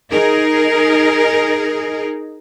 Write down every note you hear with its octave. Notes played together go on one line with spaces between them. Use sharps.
D#4 G#4 A#4 D#5